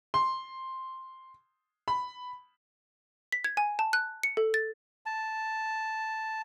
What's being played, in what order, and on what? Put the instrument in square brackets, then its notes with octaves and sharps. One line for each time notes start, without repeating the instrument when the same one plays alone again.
[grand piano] C6
B5
[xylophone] B6
G#6
G#5
A5
F#6
C#7
A4
A6
[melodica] A5